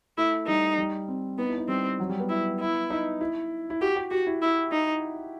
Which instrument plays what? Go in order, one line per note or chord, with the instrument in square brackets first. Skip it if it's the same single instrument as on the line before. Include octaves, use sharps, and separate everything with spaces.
[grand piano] A3 [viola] E4
[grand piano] G3 [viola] D#4
[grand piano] G3
C4
[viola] B3 [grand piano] D#4
[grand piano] E4
D#4
[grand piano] G3 [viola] C4
[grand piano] F#3
G3
B3
[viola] E4
E4
[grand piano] D#4
E4
E4
[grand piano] F#4 [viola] G4
[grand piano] G4
[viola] F#4 [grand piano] G4
[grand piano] E4
[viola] E4
D#4